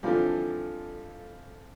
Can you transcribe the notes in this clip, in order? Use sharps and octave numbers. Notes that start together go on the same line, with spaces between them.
F2 D3 E3 F3 G3